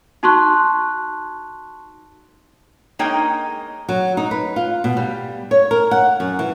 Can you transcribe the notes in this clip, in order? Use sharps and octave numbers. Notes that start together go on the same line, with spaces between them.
D#4 F#4 A5 C6 C#6 F#6
G#3 A#3 D#4 C#5 D#5 G5
F#3
D#4
B4
F4
B2
G3
C#5
A#4
F#5
F#2
E3